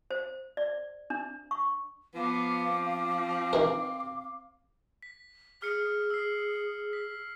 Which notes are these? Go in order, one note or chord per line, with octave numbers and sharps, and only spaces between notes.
C5
D5
D4
C#6
F3 B3 F5 D6
C4
D#3 E3 A#4
B6
G#4 F6 C#7
E6 C7
B6